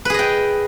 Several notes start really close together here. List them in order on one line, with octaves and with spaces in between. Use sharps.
B4 G#4 D#5 G5